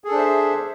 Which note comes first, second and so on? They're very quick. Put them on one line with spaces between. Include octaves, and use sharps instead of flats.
G#4 A4 D4 C5 E5